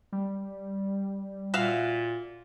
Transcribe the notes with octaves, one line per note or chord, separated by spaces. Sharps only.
G3
A#2 F#4 E5 F5